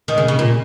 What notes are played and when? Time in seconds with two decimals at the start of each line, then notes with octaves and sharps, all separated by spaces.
0.08 D#3
0.18 C#3
0.28 C#3
0.39 A#2